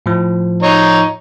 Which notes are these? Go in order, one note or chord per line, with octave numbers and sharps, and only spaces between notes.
A2 F3
D#4 C#5 A#5